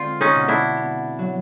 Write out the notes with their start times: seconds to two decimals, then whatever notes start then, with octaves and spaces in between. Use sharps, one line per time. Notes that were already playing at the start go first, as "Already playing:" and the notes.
Already playing: D3 G#3 C4 F4
0.21 C#4 D#4
0.35 B2
0.48 D4 E4
0.77 B3
1.19 F#3